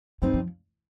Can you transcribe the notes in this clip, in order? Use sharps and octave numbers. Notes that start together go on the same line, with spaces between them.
G2 F3 G3 C4 D#4
F3